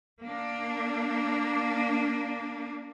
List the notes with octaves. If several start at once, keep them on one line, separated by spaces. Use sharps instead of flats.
A#3 D4